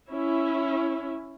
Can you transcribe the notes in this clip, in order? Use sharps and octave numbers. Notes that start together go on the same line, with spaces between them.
C#4 E4